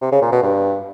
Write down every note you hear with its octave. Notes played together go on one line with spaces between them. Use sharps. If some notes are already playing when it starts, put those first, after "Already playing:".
C3
C#3
A#2
B2
G2